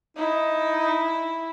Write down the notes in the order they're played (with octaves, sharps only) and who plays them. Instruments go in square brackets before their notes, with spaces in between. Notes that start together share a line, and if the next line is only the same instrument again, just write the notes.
[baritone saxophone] D#4 [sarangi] E4